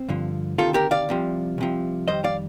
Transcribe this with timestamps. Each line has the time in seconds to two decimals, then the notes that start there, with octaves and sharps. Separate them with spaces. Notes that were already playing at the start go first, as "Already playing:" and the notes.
Already playing: C4
0.08 G2 D3 F3
0.58 D2 C3 D#3 F4 A4
0.74 G4 A#4
0.91 D5 F5
1.09 C2 C3 F3
1.58 C2 C3 F3
2.08 F2 D#3 G3 C5 D#5
2.24 D5 F5